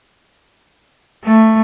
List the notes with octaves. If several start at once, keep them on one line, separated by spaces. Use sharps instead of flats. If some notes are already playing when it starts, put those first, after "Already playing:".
A3